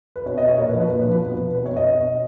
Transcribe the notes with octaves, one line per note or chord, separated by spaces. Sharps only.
B4
B2 C#5
D#5
C#5
A#2 A#4
B4
F3
B4
A#2 B4
B4
F3
B4
B2 B4
B2 B4
C#5
D#5
B2